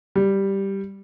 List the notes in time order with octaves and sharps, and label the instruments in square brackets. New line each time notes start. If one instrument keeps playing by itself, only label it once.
[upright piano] G3